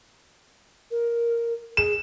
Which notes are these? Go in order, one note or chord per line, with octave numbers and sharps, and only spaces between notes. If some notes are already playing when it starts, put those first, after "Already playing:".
A#4
G#4 E7